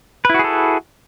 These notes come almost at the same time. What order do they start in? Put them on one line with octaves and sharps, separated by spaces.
B4 E4 F#4 G#4 A4